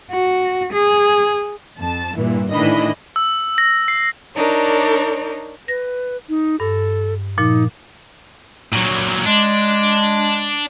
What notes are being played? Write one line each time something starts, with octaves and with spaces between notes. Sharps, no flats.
F#4
G#4
F2 A5
G2 A#2 E3
A2 D#3 E3 D4 D#5 B5
E6
A#6
C7
D4 D#4 A#4 C#5 D5
B4 A#6
D#4
G2 A4
A#2 F3 D#4
A#2 F#3
G#3 D4